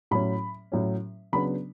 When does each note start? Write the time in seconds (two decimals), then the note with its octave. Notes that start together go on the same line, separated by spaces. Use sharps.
0.11 A2 F#3 C#4 B5
0.72 A2 F#3 C#4
1.32 C#3 F#3 B3 D4 B5